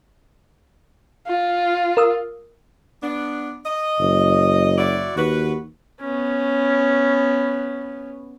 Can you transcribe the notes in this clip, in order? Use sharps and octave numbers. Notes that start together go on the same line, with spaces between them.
F4
A#4 D#6 E6
B3 D4
D#5
F#1
E4 F#4 D5
D#2 F#4 B4
B3 C#4